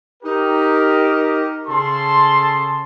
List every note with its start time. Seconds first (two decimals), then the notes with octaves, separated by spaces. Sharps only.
0.23 D#4 G4 A#4
1.67 C#3 A4 A5 C6